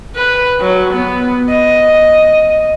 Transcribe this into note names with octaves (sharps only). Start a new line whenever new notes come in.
B4
F#3
B3
D#5